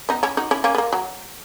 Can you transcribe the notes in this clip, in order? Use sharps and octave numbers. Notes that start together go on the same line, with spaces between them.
B3 D#4
C#4 E4
D#4 F#4
C#4 E4
A#3 C#4
B3
A#3
F#3